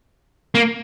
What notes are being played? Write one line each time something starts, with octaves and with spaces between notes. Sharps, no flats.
A#3